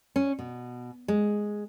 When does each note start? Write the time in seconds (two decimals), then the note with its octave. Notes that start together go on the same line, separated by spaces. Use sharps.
0.16 C#4
0.39 B2
1.08 G#3